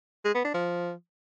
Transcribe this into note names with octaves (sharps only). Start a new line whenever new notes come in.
G#3
B3
D4
F3